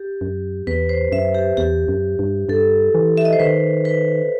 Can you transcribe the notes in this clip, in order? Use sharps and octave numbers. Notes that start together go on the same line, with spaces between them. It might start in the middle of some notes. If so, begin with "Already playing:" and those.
Already playing: G4
F#2
E2 B4
C5
F#2 E5
G4
E2 G4
F#2
G2
G2 A4
E3
E5
D#5
C5
D#3 B4
B4